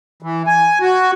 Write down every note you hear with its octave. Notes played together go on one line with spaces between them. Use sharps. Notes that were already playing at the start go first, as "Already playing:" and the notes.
E3
G#5
F#4